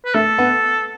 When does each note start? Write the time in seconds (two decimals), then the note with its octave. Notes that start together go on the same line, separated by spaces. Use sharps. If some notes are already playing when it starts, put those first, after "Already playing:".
0.05 B4
0.14 A3 A4
0.38 B3